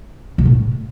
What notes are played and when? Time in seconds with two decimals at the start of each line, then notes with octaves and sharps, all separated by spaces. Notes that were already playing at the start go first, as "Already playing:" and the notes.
0.38 B2
0.45 A2